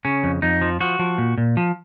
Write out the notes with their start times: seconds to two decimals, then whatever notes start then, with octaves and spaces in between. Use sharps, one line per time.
0.05 C#3 C#4
0.24 F2
0.42 F2 D#4
0.61 F3
0.80 F3 F#4
0.99 F3
1.18 A#2
1.38 A#2
1.57 F3